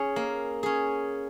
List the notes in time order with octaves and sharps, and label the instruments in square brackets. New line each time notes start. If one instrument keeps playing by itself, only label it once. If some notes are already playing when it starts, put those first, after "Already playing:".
Already playing: [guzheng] C#4 G#4 C#5
A#3
C#4 G#4